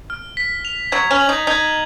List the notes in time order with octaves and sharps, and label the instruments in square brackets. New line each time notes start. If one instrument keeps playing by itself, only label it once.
[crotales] F6
B6
F7
[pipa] F#3 [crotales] G#6
[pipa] C#4
[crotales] F#7
[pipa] D#4
[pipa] D#4 [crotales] G#6